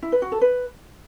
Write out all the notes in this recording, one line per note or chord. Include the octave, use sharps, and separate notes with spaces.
E4
B4
F#4
A4
B4